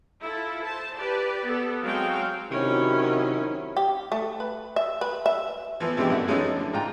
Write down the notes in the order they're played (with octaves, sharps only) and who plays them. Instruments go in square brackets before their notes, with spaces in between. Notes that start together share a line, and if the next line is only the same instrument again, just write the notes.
[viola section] E4 F4 A4
C5 A5
G4 B4 D5
B3 A4
F#3 G#3 C4 F#4 F5 G5
[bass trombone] C3 [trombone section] D#3 E4 [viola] F#3 C#4 [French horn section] F#4 A#4
[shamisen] G4
A3
B4
E5
B4
E5
[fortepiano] E3 F3 B3
B2 E3 G#3 C4 D4 G4
F#2 B2 E4 A4 F#5
E3 F3 G#3 A3 C#4 D#4
D3
G#2 F4 G5 A#5